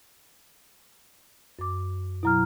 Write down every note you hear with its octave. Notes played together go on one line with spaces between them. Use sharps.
F#2 D6
B2 F#3 E4 A#5 F6